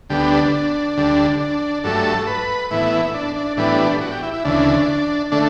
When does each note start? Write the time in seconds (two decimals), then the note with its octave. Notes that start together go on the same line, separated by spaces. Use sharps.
0.09 D2 D3 G3 B3 G4
0.31 D4
0.97 D2 D3 G3
1.40 D4
1.84 G2 F#3 A3 A4
2.27 B4
2.71 A2 E3 B3 E4
3.14 D4
3.36 D4
3.57 A2 E3 G3 B3 D4
4.01 F#4
4.12 G4
4.23 E4
4.34 E4
4.44 D2 C#3 E3 D4
5.32 D3 A3 D4